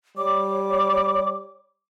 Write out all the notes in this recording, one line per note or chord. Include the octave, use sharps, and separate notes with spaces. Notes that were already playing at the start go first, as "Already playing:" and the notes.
G3 C#5 D6